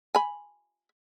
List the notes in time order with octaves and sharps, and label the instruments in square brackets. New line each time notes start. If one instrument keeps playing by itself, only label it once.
[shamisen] G#5 B5